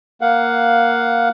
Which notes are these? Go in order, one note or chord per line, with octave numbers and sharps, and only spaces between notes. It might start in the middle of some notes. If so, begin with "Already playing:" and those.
A#3 F5 F#5